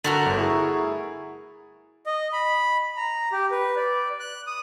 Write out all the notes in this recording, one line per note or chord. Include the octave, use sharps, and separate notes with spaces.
D3 A3 F#4 A#4 A6
G1
E4 G#4 C#6
D#5
B5
A#5
G4
B4
D5
F#6
D#6